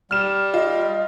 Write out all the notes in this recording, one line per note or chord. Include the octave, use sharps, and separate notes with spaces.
G3 F6 E7
F4 D#5